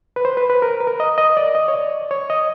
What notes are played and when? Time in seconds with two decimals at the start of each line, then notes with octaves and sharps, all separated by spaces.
0.16 B4
0.25 C5
0.37 B4
0.50 B4
0.62 A#4
0.80 B4
0.87 A#4
1.00 D#5
1.18 D#5
1.37 D5
1.55 D#5
1.68 C#5
1.74 D5
2.11 C#5
2.30 D#5